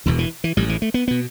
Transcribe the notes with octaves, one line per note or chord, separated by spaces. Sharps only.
E1 E2 B2 D3
E3
E3
A1 A2 G3
E3
A3
B3
B2 B3